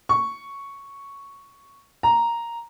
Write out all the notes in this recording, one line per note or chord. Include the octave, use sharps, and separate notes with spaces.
C#6
A#5